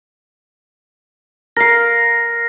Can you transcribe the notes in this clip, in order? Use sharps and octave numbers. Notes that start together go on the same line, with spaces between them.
A#4 F5 A#6 C7